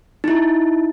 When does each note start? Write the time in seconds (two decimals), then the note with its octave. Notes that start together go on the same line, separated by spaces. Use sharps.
0.24 D#4 E4